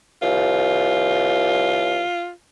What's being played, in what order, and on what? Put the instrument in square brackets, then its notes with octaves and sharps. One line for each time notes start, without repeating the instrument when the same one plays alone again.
[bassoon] C2 [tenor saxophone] F4